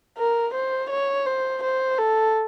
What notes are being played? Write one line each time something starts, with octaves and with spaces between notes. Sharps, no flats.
A#4
C5
C#5
C5
C5
A4